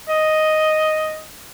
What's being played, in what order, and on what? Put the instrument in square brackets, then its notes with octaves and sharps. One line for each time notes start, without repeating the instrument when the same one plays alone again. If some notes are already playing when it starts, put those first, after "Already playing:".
[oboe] D#5